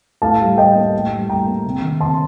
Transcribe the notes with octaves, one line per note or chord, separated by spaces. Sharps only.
A2 F5 A5
G3
A2 D#5 G5
A#3
A2
G3
A2 G5 A#5
A#3
C3
D#3
C3 A5 C6